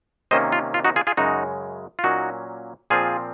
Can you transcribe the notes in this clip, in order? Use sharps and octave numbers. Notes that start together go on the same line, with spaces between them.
C3 D#3 A#3 C#4 C5 D#5
F4
F4
D#4 F#4
F4 G#4
F4 G#4
F#2 C#3 G#3 D#4 F#4
F4
A#2 F#3 A#3 C#4 D#4 F#4
A#2 F3 C4 F4 G#4